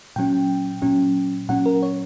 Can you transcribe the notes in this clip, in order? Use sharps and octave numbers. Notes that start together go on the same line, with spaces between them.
A#2 F#3 C#4 G5
A#2 F#3 C#4
A#2 F#3 C#4 F#5
A#4
C#5